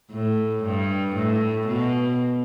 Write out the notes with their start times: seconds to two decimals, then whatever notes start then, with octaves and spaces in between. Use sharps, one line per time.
0.12 A2
0.64 G2
1.16 A2
1.68 B2